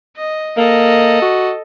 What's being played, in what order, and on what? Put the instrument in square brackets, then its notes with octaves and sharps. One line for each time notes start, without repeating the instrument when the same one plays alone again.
[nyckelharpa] D#5
[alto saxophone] A#3 [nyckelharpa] A4 D#5
[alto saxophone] F#4